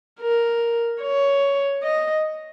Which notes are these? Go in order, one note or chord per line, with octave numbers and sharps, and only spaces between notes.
A#4
C#5
D#5